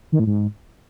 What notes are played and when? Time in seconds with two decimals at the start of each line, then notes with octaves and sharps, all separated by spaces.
0.12 D#3
0.19 A2
0.27 G#2